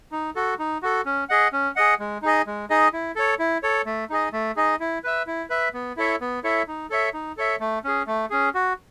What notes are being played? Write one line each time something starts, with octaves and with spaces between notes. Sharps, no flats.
D#4
F#4 A4
D#4
F#4 A4
C#4
G#4 D#5 F#5
C#4
G#4 D#5 F#5
G#3
D#4 G#4 D#5
G#3
D#4 G#4 D#5
E4
A4 C#5
E4
A4 C#5
A3
D#4 G#4 D#5
A3
D#4 G#4 D#5
E4
B4 E5
E4
B4 E5
B3
E4 A4 C#5 E5
B3
E4 A4 C#5 E5
D#4
A4 C#5 E5
D#4
A4 C#5 E5
A3
C#4 G#4
A3
C#4 G#4
F#4